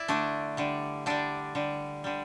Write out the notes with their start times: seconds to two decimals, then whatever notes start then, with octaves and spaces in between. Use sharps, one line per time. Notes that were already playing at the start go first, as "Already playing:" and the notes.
Already playing: E4 D5
0.08 D3 A3 D4
0.57 D3 G3
1.06 D3 G3 D4
1.55 D3 G3
2.04 D3 G3